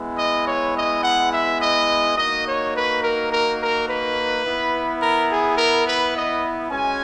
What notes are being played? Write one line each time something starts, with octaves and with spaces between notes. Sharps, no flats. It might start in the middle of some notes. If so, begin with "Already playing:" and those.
Already playing: G#3 B3 E4
D#5
C#5
D#5
F#5
E5
D#5
A#3 D#4 F#4 D#5
C#5
B4
A#4
A#4
A#4
B4
B3 E4
A#4
G#4
A#4
B4
D#5
G#3 C#4 F#4 G#5